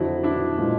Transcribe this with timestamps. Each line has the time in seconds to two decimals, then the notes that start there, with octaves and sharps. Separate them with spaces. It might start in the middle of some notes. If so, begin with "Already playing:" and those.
Already playing: F2 D3 F#3 E4 F#4
0.23 D4 E4
0.58 A#2 F3 G#3